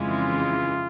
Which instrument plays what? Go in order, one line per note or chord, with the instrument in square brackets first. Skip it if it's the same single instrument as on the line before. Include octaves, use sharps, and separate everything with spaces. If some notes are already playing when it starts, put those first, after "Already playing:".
Already playing: [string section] F2 C#3 E3 G#3 [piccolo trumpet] F4